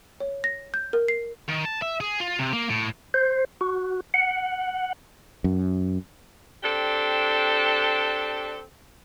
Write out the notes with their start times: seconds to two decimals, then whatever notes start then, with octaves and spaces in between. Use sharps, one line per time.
0.20 C#5
0.44 A#6
0.74 G6
0.93 A#4
1.08 C7
1.49 D#3
1.65 A5
1.82 E5
2.01 G#4
2.20 F4
2.39 C3
2.53 A#3
2.70 A2
3.14 C5
3.61 F#4
4.14 F#5
5.44 F#2
6.63 C4 D4 G4 A4